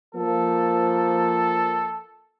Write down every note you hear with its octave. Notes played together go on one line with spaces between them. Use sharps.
F3 A#3 A4